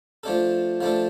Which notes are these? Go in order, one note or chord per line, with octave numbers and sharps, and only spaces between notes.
F3 A3 D4 A4
F3 A3 D4 A4